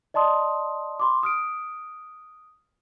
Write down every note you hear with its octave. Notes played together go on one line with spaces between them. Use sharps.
D5 D#5 A5 C6 D#6
B5 C6 D6
D#6 F6 D7